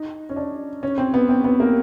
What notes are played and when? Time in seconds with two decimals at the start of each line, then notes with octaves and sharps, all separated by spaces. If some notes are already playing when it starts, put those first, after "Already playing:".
Already playing: D#4
0.29 C#4
0.36 D4
0.83 C#4
0.98 C4
1.14 B3
1.29 C4
1.44 B3
1.60 A#3